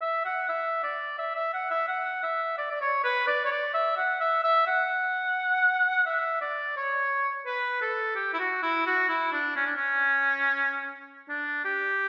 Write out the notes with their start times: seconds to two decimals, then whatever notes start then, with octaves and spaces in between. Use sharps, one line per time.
0.01 E5
0.25 F#5
0.49 E5
0.83 D5
1.18 E5
1.35 E5
1.53 F#5
1.70 E5
1.88 F#5
2.23 E5
2.58 D5
2.70 D5
2.81 C#5
3.04 B4
3.27 D5
3.45 C#5
3.51 D5
3.74 E5
3.97 F#5
4.20 E5
4.43 E5
4.67 F#5
6.06 E5
6.41 D5
6.77 C#5
7.46 B4
7.81 A4
8.15 G4
8.33 E4
8.39 F#4
8.62 E4
8.86 F#4
9.09 E4
9.32 D4
9.56 C#4
9.66 D4
9.76 C#4
11.29 D4
11.65 G4